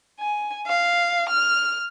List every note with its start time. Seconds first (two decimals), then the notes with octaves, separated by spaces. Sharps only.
0.20 G#5
0.67 F5
1.29 F6